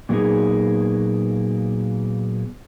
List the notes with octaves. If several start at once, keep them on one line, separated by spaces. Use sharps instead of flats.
A#2 F#3 A#3 B3 D#4 G#4